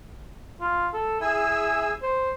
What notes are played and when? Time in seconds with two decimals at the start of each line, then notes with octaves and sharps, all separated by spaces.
0.60 F4
0.93 A4
1.21 E4 G#4 G#5 E6
2.02 C5